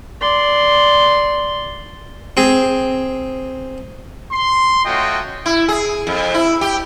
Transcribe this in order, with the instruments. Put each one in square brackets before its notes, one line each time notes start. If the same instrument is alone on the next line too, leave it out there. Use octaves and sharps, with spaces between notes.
[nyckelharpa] D5 C6
[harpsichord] C4 G#4
[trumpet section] C6
A3 C#4 F4 F#4 D#5 G5
[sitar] E4
G#4
F2
E4
G4